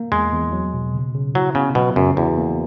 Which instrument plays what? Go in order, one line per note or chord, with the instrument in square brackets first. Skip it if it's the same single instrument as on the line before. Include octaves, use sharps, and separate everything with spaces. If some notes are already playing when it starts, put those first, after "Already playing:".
Already playing: [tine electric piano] A#3
[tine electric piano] E2 [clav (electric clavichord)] G#3
[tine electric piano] E2
F#3
B2
C#3
C#3
[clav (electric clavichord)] F#3 [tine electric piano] E4
[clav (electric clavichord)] C#3 [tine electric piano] B3
[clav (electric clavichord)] B2 [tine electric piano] F#3
[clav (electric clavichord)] F#2 [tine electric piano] C#3
[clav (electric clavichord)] E2 [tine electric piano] F#4
[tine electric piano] A#3